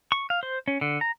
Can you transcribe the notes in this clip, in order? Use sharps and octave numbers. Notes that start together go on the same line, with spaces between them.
C#6
F5
C5
C#4
D3
A#5